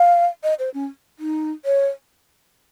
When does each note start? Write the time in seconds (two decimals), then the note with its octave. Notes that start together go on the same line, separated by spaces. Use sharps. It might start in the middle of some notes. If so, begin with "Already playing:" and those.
Already playing: F5
0.43 D#5
0.59 C5
0.74 C#4
1.19 D#4
1.65 C#5